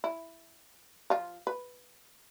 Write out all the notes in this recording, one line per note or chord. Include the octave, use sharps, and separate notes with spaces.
E4
F3 F4
B4